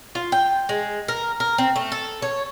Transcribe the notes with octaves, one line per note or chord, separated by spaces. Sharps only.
F4
G5
G#3
A#4
A#4
C4
A3
A4
C#5